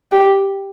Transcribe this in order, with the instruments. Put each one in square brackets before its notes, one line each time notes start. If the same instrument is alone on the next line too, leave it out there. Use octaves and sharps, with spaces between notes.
[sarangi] G4